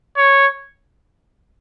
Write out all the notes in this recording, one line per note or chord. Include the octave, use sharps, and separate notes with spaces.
C#5